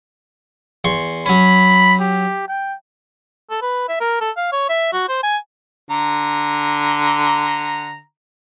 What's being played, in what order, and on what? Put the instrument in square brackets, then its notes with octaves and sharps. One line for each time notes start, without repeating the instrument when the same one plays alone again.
[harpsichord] E2 C6 C#6
[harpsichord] F#3 C#4 [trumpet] B5
[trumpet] G4
G5
[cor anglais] A4
B4
E5
A#4
A4
F5
C#5
E5
F#4
C5
G#5
[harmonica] D3 A#5